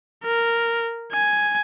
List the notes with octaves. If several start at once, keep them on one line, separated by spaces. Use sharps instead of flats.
A#4
G#5